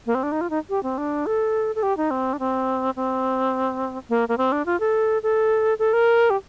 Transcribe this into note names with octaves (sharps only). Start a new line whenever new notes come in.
A#3
C4
D4
D#4
F4
D#4
G4
C4
D4
A4
A4
G4
D#4
C4
D4
C4
C4
A#3
A#3
C4
D4
F4
A4
A4
A4
A#4
G4